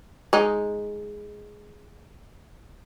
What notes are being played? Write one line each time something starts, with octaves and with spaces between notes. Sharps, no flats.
G#3 D#4